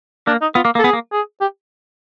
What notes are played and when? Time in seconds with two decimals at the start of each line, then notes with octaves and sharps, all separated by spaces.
0.27 A#3 D4
0.42 D#4
0.55 B3 F4
0.65 A#3
0.75 A#3
0.79 A4
0.84 B3 G#4
0.93 A#3
1.12 G#4
1.41 G4